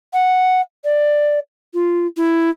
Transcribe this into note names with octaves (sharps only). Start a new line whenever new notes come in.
F#5
D5
F4
E4